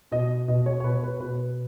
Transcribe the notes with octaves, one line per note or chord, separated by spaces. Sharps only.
B2 D#5
B2 D#5
C#5
C#5
B2 B4
B4
B2 B4